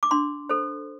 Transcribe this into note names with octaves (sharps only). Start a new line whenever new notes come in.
D6
D4 C6
A4 C5